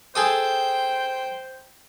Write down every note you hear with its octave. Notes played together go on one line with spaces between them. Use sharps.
G#4 A4 C5 G5 D#6